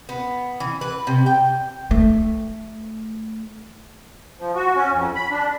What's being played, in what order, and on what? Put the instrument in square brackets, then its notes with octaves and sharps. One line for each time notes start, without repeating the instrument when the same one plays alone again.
[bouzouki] B3
E3
B4
C3
G5
[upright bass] A3
[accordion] F3
F#4
C#4
F2
B5
D4